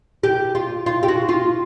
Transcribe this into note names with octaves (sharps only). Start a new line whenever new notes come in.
G4
F4
F4
G4
F#4
F4